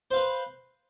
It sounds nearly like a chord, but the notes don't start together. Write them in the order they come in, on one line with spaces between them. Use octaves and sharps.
C5 F5 B4